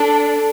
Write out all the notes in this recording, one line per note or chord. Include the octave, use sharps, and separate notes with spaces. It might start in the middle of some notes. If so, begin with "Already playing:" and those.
Already playing: D4 A4